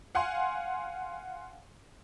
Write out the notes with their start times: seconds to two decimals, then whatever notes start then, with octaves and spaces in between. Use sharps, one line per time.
0.15 F5 F#5 G#5 C6